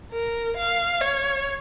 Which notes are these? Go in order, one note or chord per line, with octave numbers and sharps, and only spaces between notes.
A#4
F5
C#5